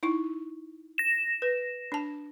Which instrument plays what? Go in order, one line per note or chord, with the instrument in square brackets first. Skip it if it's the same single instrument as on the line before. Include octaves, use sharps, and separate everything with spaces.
[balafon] D#4 E4 C#6
[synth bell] A#6 E7
[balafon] B4
D4 A5